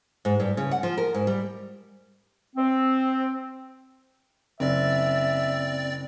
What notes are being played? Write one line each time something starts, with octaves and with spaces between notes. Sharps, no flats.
G#2
G2
C#3
F#5
F3
A#4
G#2
G3
C4
F#1 C4 D5 E5 A6